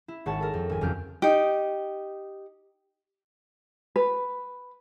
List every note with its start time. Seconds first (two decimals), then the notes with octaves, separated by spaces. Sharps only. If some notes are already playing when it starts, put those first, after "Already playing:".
0.08 E4
0.26 G#1 C#5 F#5 A5
0.40 A4 A#4
0.53 F2
0.70 G#1 G#5
0.81 F#1 F2 F6 G6 D7
1.22 D#4 G4
3.96 B4